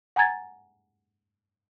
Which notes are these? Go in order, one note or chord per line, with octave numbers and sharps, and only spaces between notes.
F#5 G#5 A#5 G#6 A6